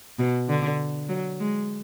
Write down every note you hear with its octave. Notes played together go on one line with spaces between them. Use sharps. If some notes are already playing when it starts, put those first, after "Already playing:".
B2
D3
F#3
G#3